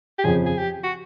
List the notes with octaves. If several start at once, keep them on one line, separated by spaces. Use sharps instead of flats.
G4
F2 C#3 F3 G#4
G#4
G4
F#4